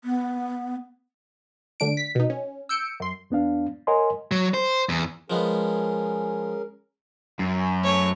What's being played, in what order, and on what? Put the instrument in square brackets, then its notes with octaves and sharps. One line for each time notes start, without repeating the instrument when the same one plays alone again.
[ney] B3
[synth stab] D2 D3 D4 D7
B6
B2 D#4
C#4
E6 G6 C#7 D7
F#2 C6
[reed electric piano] E2 B3 D4 F5
A#4 C#5 D#5 F#5 G#5 C6
[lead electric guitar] F#3
C5
E2
[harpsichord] F3 G#3 B3 [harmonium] C#4 G#4 A#4
[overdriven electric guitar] F#2
[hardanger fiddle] A3 C#5